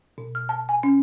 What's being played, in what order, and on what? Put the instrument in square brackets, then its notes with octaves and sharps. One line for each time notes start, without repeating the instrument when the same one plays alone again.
[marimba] B2
F6
A5
G#5
C#4